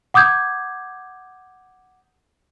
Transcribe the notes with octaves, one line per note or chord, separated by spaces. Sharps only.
F#5 D6 D#6 G6 G#6